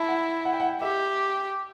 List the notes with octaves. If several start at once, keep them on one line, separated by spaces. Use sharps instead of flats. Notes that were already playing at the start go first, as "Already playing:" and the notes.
Already playing: E4 A5
F#5
F#5
G5
F#5
G4 E5